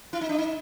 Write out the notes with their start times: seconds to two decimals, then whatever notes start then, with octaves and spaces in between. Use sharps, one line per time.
0.13 E4
0.21 D#4
0.29 D4
0.38 D#4